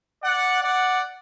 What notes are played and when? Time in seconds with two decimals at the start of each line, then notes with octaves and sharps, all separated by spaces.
0.22 D5 F#5
0.63 D5 F#5